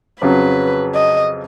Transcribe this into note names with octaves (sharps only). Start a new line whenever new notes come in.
F2 C#3 F#3 B4
D#5